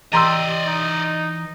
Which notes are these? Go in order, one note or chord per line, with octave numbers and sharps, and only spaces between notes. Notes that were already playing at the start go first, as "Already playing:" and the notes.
E3 G4 D5 D#5 A#5 C6 E6
D#4